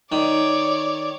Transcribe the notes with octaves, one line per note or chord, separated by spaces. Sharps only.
D#3 C#5 D5